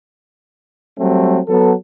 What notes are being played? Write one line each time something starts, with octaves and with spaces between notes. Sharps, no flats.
F#3 G3 A3 C4
F#3 B3 A4